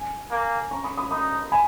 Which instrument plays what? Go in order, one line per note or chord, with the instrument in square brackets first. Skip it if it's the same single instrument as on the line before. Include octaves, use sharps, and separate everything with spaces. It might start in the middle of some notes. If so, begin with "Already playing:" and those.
Already playing: [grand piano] G#5
[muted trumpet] A#3
[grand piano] A#5 C#6
B5 D#6
B5 D#6
[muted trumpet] D#4 [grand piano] B5 D#6
[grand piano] G#5 B5